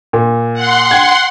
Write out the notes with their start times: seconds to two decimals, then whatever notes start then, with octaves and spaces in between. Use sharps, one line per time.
0.13 A#2
0.54 F#5 C6
0.91 G5 G#6